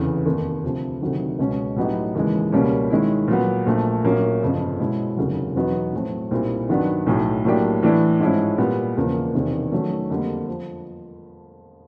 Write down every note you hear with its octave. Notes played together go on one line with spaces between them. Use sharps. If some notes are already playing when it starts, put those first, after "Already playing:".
Already playing: F1 E2 C#3 E3
F1 D#2 D#3
D2 C3 F3
D2 C3 D#3 F#3
C#2 B2 G#3 C#4
A2 F#3 B3 D#4 G4
D#2 C#3 E3 G#3
C#2 B2 G3 A#3 C#4
D#3 G#3 C#4 E4
A#2 F#3 B3
A#1 A#2 F3 A3
A#1 A#2 F#3 A#3 C#4
G1 F2 C#3 F3
B2 G#3 C#4 E4
F1 D#2 C#3 F#3
E2 B2 F#3 B3 D#4
A2 F#3 A3 C4
B1 A#2 G3 C4 E4
G2 D#3 F#3 B3 D4
B1 A2 F#3
A2 F#3 A#3 D4 G4
A2 E3 A3 D4
G#2 F3 G#3 C#4 E4
A#2 G3 B3
E1 E2 C#3 F3 A#3
E1 E2 C3 D#3
D#3 F#3 A3 C#4
F2 D3 G3 A#3
F3